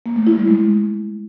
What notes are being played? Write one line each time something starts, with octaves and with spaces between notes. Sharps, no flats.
A#3
A3
E4
G3
G#3